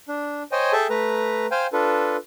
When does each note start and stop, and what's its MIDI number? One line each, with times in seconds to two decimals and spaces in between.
0.08 0.43 62
0.52 0.72 72
0.52 0.72 73
0.52 0.72 75
0.52 0.72 79
0.52 0.72 80
0.73 0.87 68
0.73 0.87 69
0.73 0.87 76
0.73 0.87 79
0.73 0.87 81
0.90 1.46 57
0.90 1.46 71
0.90 1.46 82
1.51 1.67 72
1.51 1.67 77
1.51 1.67 79
1.51 1.67 80
1.73 2.17 62
1.73 2.17 65
1.73 2.17 69
1.73 2.17 71